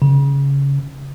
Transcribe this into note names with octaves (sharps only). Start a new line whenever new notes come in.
C#3